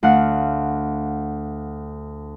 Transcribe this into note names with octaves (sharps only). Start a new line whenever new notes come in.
D2 F5 F#5